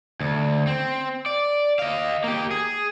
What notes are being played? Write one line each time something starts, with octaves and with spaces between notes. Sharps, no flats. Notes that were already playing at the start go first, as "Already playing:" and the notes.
D2
C4
D5
D#5 F5
A#3 G4
G#4